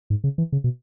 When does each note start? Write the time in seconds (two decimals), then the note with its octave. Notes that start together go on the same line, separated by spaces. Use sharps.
0.10 G#2
0.24 C#3
0.38 E3
0.52 C#3
0.64 B2